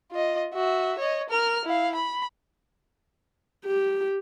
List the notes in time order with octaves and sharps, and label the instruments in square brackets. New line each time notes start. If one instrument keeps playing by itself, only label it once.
[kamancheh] F4 D#5
F#4 E5
C#5 D#5
A#4 F6
E4 F5
B5
[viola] G4